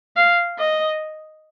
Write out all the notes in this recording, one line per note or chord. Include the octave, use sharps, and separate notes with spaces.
F5
D#5